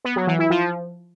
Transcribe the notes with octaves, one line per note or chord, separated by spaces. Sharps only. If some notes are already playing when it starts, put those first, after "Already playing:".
B3
F#3
E3
E4
F3